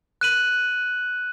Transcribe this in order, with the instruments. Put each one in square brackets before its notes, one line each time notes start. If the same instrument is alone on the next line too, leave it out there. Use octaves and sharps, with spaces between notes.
[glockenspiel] F#6 D#7 F#7